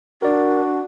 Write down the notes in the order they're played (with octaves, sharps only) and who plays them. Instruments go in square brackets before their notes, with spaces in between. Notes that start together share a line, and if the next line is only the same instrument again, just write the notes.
[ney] D4 [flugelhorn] F#4 [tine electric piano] A#4 D5